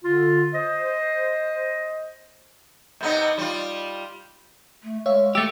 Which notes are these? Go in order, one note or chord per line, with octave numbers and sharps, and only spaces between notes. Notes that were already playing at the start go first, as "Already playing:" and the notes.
D3 F4
C5 D#5
C3 B3 D#4
G3 F4
A3
G#3 C#5 E5 F5
A3 G4 E6 A6 C#7